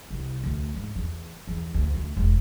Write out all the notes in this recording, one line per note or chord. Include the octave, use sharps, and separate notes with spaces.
C2
D2
G#2
E2
E2
D2
D2
E1